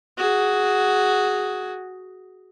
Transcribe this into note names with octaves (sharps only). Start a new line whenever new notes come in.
F#4 G#4